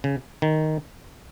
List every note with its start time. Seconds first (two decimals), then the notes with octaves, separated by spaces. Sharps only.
0.04 C#3
0.42 D#3